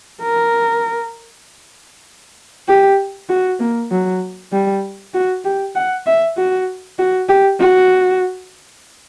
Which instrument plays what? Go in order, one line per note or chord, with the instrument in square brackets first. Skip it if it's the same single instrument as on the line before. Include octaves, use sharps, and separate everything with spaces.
[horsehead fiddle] A#4
G4
F#4
A#3
F#3
G3
F#4
G4
F#5
E5
F#4
F#4
G4
F#4